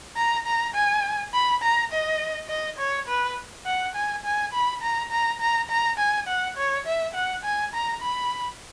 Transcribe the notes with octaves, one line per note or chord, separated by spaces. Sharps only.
A#5
A#5
G#5
B5
A#5
D#5
D#5
C#5
B4
F#5
G#5
G#5
B5
A#5
A#5
A#5
A#5
G#5
F#5
C#5
E5
F#5
G#5
A#5
B5